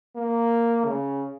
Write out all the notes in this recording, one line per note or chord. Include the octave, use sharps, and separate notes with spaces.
A#3
C#3